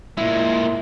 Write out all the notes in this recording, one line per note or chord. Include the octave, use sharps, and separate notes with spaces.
A#2 G#3 E4